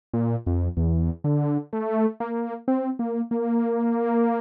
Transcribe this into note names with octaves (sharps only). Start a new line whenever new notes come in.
A#2
F2
E2
D3
A3
A#3
C4
A#3
A#3